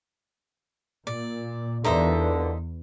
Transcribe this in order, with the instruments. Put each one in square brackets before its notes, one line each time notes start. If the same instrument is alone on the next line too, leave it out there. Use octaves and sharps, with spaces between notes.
[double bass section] A#2 [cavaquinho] D5
[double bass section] E2 [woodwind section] G2 A#2 D3 [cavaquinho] D#4 C5 E5